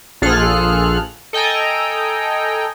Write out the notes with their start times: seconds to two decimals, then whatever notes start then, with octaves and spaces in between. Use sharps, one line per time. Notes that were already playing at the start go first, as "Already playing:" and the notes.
0.22 A#1 F4 G#4 A4 F6 F#6
1.33 A4 D#5 G5 G#5 A#5